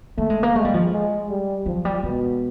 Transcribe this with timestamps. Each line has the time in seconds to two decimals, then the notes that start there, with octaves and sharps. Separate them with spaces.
0.18 A3 A#3
0.30 G#3
0.43 A#3
0.55 G#3 A3
0.65 G3
0.74 F3
0.92 G#3
1.29 G3
1.66 F3 F#3
1.85 G3
2.03 B2 G#3